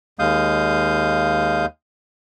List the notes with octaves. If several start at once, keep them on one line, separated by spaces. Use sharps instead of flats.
D#2 G#3 F5 D#6 G6